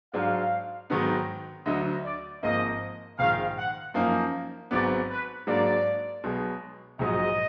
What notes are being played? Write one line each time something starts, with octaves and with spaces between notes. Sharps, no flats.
G#2 F#3 D4 F5
G#2 D#3 F#3 B3 D#4
D2 D3 F#3 D#5
D5
G#1 G#2 F3 A#3 D#5
A#1 G#2 D#3 F5
F#5
F#2 F3 A#3 D#4
G#1 G#2 F#3 B3 D5
B4
G#2 F#3 A#3 D4 D5
B1 B2 G#3
A#1 G#2 F#3 D#5